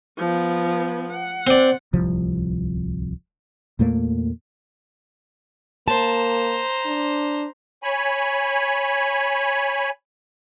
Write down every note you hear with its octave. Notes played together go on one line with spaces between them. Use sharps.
F3 B3
F#5
C4 D5
D1 C2 F3
E2 A#2 A3 A#3
A#3 C5 A5 A#5
D4
C#5 G#5 B5